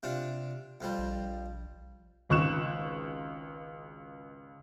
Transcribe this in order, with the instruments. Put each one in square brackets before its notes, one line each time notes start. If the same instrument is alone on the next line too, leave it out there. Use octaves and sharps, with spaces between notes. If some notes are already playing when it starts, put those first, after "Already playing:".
[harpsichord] C3 D4 F4
F2 F3 G3
[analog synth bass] A#1
[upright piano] G#1 C#2 C#6 F#6 E7